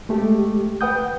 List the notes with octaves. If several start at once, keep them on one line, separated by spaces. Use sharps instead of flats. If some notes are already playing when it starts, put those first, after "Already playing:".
G#3 A3 G4
B4 F#5 G5 D#6 G6